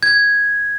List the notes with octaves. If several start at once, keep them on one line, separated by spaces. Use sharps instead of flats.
G#6